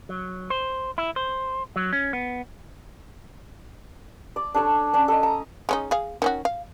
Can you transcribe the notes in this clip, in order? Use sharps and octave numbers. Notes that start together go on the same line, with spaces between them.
F#3
C5
E4
C5
F#3
C#4
B3
D5
D4 A4 C#5
C#4 D4
A4 D#5
A#5
G#3 C#4 D#4
G#4 F5
D#3 C#4 F#4
F5